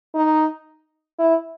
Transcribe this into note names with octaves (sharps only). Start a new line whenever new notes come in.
D#4
E4